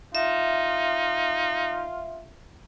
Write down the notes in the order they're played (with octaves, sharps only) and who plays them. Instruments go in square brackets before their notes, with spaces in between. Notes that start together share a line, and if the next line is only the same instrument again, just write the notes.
[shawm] D#4 [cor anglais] F4 [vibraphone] E5